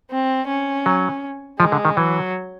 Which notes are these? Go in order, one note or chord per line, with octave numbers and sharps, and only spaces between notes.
C4
C#4
F#3
F3 G#3
D3
D#3
E3 F#3